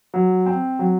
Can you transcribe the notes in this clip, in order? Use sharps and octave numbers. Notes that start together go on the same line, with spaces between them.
F#3
C4
F#3